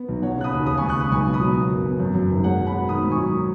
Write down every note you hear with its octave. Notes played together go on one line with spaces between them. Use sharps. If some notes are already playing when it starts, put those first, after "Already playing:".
Already playing: B3
B1
F#3 C#5 F#5
C#3 F#6
B5 D#6
D#2
C#3 B5 D#6
C#2 G#5 C#6
C#6 F#6
C#2 B5 D#6
B1 G#5 C#6
B2
B5 D#6
F#3
B3
F#1
B3
F#2
F#2
G#1
G#3 C#5 F#5
B2
F#5 B5
B2
D#3 B5 D#6
G#2
G#5 C#6
F#3